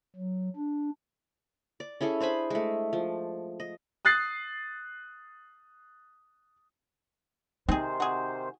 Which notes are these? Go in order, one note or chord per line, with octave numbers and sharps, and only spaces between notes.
F#3
D4
D5
C#4 E4 G#4 A4
D4 C5 G#5 B5
G#3 A3
F3
D#5
D#6 F#6 A6 C7
C3 D#3 C4 D#4 G#4 C5
F#4 G#4